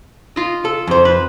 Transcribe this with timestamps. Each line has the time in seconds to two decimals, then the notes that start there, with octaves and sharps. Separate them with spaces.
0.36 F4 D#5
0.65 A4
0.87 F2 C5
1.05 B4